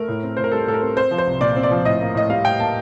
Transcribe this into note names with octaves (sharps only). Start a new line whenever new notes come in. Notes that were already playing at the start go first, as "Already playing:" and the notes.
Already playing: A3 A#4
A2
C4
A2 C5
A#4
G3 A4
A2 A4
A#4
C4
C4 C5
F3
C5
C2
A#2 D5
C4
D5
F3
A2 D#5
A#3
A2 D#5
G3 F5
A2 G5
A#3 A5